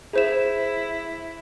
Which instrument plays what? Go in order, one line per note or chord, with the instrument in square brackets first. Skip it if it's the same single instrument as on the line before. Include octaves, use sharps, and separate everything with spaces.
[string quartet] E4 [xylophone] G#4 C5 E7